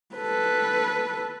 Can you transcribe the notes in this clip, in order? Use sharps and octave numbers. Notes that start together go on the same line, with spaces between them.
A4 B4